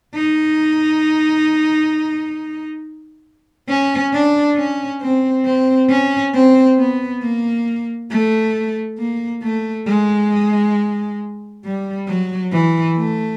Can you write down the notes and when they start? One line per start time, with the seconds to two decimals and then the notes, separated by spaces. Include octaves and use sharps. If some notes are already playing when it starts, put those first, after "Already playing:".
0.15 D#4
3.68 C#4
4.13 D4
4.57 C#4
5.01 C4
5.45 C4
5.89 C#4
6.34 C4
6.78 B3
7.22 A#3
8.10 A3
8.98 A#3
9.42 A3
9.87 G#3
11.64 G3
12.08 F#3
12.52 E3
12.97 A3